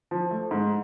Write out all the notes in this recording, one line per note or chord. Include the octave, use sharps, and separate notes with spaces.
F3
A3
G#2